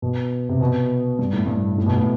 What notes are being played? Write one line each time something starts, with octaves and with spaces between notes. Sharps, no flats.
B2
C3
B2
G2
A2
G2
A2
B2
A2